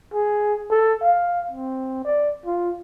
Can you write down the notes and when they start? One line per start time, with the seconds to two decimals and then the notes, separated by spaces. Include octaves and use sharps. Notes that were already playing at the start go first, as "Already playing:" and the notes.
0.14 G#4
0.70 A4
1.03 F5
1.51 C4
2.05 D5
2.46 F4